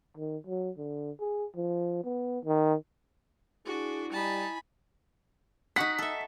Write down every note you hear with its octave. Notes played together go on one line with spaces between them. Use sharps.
D#3
F#3
D3
G#4
F3
B3
D#3
D4 E4 F#4 G#4
G3 D#4 G#5 A5 B5
D#4 F#4 F#5 B6
A4 E5